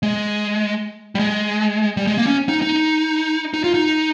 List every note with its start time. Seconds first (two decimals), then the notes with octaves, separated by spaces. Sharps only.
0.03 G#3
1.15 G3
1.19 G#3
1.97 G3
2.07 G#3
2.18 A#3
2.27 C#4
2.49 D#4
2.62 D#4
3.54 D#4
3.64 F4
3.74 D#4